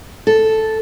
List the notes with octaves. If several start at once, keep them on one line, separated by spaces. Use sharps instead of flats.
A4